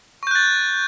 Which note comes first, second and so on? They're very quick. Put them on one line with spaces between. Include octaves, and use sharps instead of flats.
C#6 G6 F#6 A6